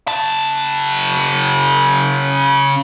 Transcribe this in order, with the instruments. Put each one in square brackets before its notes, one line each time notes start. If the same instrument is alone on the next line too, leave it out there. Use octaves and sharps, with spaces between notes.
[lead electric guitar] C#3 A5